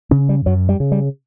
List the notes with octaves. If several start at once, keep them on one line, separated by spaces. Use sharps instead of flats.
C#3 C#4
G3
F#2 F#3
G3
C#3
G3